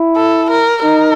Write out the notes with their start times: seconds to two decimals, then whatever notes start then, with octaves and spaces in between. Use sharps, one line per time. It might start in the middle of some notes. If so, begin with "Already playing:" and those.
Already playing: E4
0.16 A4
0.50 A#4
0.84 D#4 A#4